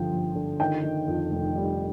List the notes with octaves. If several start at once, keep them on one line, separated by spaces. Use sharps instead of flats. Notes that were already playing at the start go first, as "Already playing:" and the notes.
Already playing: G1 D3 F3 G5
F3
D3
D#3 G5
D#3
F2
F1
G3